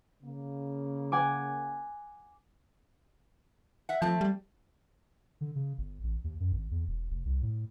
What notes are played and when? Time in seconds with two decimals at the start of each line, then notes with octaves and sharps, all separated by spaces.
0.22 C#3 A#3
1.12 F#5 G#5 D6
3.89 E5 F#5
4.02 F3 A3 C4 A5
4.21 G3
5.41 D3
5.55 C#3
5.78 G1
6.03 A1
6.24 D#2
6.40 F#2
6.52 G#1
6.71 E2
6.88 E1
7.11 F1
7.25 C2
7.42 A2